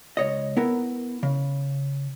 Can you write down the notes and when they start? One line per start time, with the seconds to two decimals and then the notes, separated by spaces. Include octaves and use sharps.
0.17 C#2 C#5 D#5
0.57 B3 E4 A#4
1.23 C#3